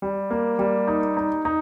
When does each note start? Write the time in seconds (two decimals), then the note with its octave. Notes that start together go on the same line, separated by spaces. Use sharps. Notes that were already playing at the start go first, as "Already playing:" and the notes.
0.02 G3
0.31 A#3
0.59 G3
0.87 D#4
1.17 D#4
1.45 D#4